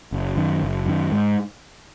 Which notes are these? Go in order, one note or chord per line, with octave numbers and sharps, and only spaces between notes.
F#1
F#2 D#3
F#1
F#2 D#3
G#2